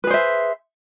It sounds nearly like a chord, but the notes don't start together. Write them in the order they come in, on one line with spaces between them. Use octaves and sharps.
B4 G#4 C5 E5